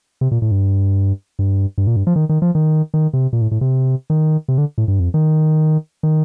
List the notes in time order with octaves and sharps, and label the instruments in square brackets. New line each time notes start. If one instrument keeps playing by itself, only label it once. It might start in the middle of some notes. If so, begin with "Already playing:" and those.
[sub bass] C3
A#2
A2
G2
G2
G2
A#2
G2
F3
D#3
D#3
F3
D#3
D#3
C3
A#2
A2
A2
C3
D#3
C3
D3
A2
G2
F2
D#3
D#3